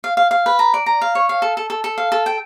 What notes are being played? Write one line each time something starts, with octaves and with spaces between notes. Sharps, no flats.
F5
F5
F5
B4
A#5
D5
A#5
F5
C#5
F5
A4
A4
A4
A4
F5
A4
G5